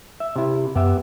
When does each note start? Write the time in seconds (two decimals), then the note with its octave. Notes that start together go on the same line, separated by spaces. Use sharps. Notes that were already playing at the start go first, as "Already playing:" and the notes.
0.20 E5
0.36 C3 E4
0.75 F#2 B3 G4 E5